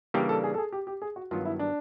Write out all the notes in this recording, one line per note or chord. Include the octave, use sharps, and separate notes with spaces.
C#3 E3 G3 A#3 D4 G4
A4
G#4
A4
G#4
G4
G4
G#4
F#4
G2 D#3 F#3 B3 F4
E4
D4